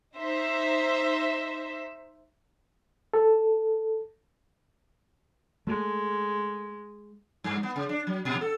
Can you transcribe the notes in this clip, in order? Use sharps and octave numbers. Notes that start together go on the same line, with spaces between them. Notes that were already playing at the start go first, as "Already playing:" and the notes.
D#4 C5 E5
A4
G#3 A3
G2
B3
C#3
D4
F#3
A#2
A4